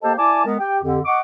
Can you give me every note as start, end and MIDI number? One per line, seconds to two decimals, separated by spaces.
0.03 0.13 58
0.03 0.13 67
0.03 0.13 69
0.03 0.13 72
0.03 0.13 75
0.03 0.13 81
0.18 0.46 64
0.18 0.46 74
0.18 0.46 80
0.18 0.46 81
0.18 0.46 86
0.46 0.58 56
0.46 0.58 59
0.46 0.58 70
0.60 0.79 67
0.60 0.79 79
0.83 1.00 41
0.83 1.00 50
0.83 1.00 67
1.05 1.21 75
1.05 1.21 78
1.05 1.21 85
1.05 1.21 86